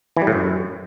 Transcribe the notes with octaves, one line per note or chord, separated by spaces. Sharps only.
E3
G3
A2
F#2